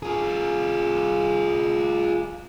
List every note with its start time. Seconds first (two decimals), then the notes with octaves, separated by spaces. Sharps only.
0.03 F4 G#4